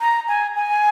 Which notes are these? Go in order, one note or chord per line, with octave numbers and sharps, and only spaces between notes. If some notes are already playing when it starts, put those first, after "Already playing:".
A#5
G#5
G#5